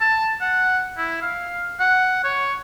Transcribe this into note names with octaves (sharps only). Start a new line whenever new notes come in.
A5
F#5
E4
F5
F#5
C#5